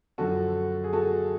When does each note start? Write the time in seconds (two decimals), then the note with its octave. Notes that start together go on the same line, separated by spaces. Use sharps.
0.18 F#2 D3 F3 F#4 A4
0.84 G#4
0.93 F#4 A4